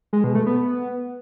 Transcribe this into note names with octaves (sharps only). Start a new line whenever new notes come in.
G#3
B2
A3
B3